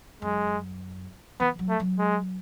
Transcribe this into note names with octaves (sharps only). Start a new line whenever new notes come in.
F#2 G#3
E3 B3
F#3
A3
F#3
G#3